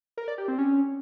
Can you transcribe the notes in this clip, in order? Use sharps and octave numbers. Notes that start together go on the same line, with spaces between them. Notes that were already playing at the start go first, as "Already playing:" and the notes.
A#4
D5
G4
C4
C#4